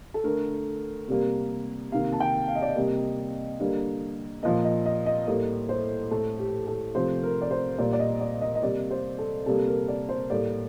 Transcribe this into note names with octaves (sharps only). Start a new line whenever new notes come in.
A4
D3 A3 A#4
C3 G3 A#3
C3 D#3 A#3 F5
A5
G5
F5
D#5
D5
D#5
C3 G3 A#3
D3 G3 A#3
A#2 F3 A#3 D#5
D#5
D#5
D#5
A2 G3 A#3
C5
A2 A3 A4
G4
A4
C3 F3 A3 C5
A#4
D5
C5
A#2 G3 A#3 D5
D5
D#5
D5
D#5
D#5
C3 G3 A#3 D5
C5
A4
C3 G3 A#3 A4
A#4
D5
C5
A2 G3 A#3 D5